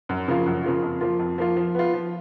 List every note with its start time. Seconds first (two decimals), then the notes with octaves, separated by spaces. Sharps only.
0.09 F#2
0.28 C#3 F3 A#3 F4
0.46 F#2
0.64 C#3 F3 A#3 F4
0.83 F2
1.01 F3 A#3 F4
1.19 F2
1.38 F3 A#3 F4
1.56 F3
1.75 B3 F4
1.93 F3